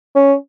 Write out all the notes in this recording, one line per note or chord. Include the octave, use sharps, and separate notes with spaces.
C#4